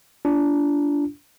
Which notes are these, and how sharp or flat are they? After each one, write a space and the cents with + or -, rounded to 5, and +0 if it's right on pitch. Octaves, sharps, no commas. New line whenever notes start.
D4 -25 F4 -40